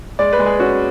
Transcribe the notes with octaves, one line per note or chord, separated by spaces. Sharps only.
G#3 D5
B4
G#3
G#4
C#4 F#4